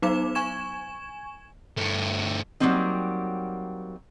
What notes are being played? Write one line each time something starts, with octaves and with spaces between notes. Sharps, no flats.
F#3 B3 D#4 C5 D6 E7
G#5 C#6 G#6 E7
G2 A3
F#3 G3 A3 A#3 C4 D#4